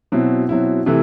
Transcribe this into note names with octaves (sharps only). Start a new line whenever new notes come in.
B2 F#3 C4 E4
B2 F#3 C4 E4
C3 E3 A3 E4